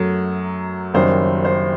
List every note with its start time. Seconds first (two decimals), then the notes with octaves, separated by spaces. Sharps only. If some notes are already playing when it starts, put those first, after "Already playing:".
Already playing: F#2 F#3 A3
0.94 F#1 F#2 D#3 G3 C5
1.45 C5